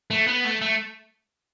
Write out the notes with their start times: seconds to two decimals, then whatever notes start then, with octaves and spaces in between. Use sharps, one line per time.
0.11 A3
0.27 B3
0.45 A3
0.61 A3